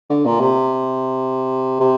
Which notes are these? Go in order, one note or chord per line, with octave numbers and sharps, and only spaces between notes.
D3
A#2
C3
C3